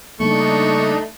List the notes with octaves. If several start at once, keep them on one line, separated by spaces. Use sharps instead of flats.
C#3 G3 A3 A#3 D4 D#4 C#6